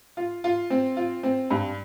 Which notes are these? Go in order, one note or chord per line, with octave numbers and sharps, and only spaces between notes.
F4
F4
C4
F4
C4
G2